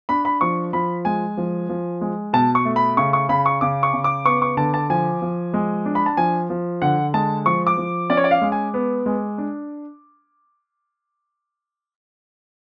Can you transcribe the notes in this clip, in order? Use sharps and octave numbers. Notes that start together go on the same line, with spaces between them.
D4 B5
B5
F3 C#6
F3 B5
G#3 G#5
F3
F3
G#3
B2 A5
C#6
A3
B5
C#3 C#6
C#6
C#3 B5
C#6
C#3 D6
C#6
C#3
D6
B3 C#6
C#6
D3 A5
A5
F3 G#5
F3
G#3
D4
B5
A5
F3 G#5
F3
D3 F#5
G#3 A5
F3 C#6
D6
F3
C#4 D5
C#5
D5
F5
G#3
G#5
B3
G#3
D4